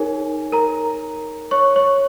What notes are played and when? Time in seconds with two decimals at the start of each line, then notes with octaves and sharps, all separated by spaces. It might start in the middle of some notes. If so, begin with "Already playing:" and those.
Already playing: D#4 G#4 A#4 C#5 G#5
0.52 A#4 A#5
1.51 C#5 C#6
1.76 C#5 C#6